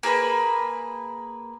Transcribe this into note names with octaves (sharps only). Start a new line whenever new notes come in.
A#3 G#4 B4 B5